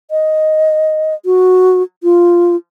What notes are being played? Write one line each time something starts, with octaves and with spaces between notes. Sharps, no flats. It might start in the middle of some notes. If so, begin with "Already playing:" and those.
D#5
F#4
F4